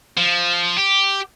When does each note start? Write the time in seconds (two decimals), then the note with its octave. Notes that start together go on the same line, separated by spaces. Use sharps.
0.17 F3
0.77 G4